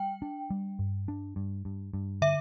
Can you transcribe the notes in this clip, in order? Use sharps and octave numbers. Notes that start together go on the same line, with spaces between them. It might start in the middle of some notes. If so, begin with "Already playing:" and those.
Already playing: G3 G5
D4
G3
G2
D4
G2
G2
G2
D3 E5